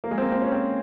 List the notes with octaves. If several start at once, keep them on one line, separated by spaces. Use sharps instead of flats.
A#3
G#3
C4
A#3
C4
C#4
C4